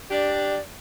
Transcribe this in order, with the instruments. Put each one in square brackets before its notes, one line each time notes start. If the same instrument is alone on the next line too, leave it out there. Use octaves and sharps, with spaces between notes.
[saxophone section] D4 G4 [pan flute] D5